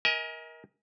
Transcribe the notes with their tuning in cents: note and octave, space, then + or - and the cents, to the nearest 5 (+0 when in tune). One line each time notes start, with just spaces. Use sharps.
A#4 +20 D#5 +40 G#5 +0